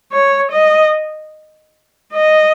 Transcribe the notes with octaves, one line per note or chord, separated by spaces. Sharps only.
C#5
D#5
D#5